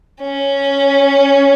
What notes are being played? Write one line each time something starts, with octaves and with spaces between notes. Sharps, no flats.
C#4